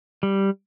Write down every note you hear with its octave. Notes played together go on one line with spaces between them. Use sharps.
G3